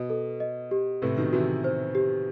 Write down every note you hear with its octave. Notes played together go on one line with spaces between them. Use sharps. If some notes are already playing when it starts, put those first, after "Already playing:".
Already playing: B2 D#5
A4
D#5
G4
A2 C3 B4
B2 D#3
C3 E3 F#4
C5
G4